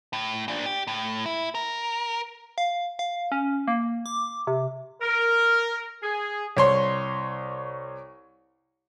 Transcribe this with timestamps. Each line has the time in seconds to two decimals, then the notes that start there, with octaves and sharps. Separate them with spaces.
0.13 A2
0.48 A#2 D4
0.66 G4
0.87 A2
1.26 E4
1.55 A#4
2.58 F5
2.99 F5
3.32 C#4
3.68 A#3
4.06 D6
4.47 C3
5.02 A#4
6.02 G#4
6.57 C2 C#5 C6